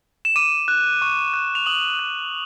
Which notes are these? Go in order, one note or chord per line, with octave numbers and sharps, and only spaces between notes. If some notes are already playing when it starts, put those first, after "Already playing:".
E7
D6 D#7
F#6
C#6
F#6
F7
D#6 F#7
F#6